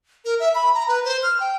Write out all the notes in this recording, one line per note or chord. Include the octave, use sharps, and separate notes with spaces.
A#4
E5
B5
A#5
B4
C5
F6
G5